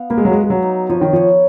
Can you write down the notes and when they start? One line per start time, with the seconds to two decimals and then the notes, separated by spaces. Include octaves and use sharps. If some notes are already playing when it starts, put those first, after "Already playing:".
Already playing: B3 F5
0.10 A#3 B4
0.18 G#3
0.25 F#3
0.32 G#3
0.37 B4
0.44 G#3
0.50 F#3
0.63 D#4
0.89 F3 C#5
1.01 D#3
1.13 F3 C#5